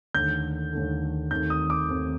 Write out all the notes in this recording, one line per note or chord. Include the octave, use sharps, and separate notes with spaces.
D#2 D3 A3 G6
D#2 D3 A3
D#2 D#3 A3 C4 G6
D#6
D6
D#2 D#3 A3 C4